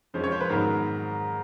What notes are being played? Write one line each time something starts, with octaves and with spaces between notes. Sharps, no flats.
F2 C3 F3 G#3 C#4 C5
C#5
C5
B4
G#2 D#3 F#3 B3 A#4